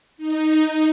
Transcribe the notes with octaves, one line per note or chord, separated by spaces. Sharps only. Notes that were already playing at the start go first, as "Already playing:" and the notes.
D#4